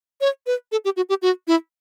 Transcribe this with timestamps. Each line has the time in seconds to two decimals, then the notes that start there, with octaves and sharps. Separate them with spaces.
0.21 C#5
0.46 B4
0.72 A4
0.85 G4
0.96 F#4
1.09 G4
1.22 F#4
1.47 E4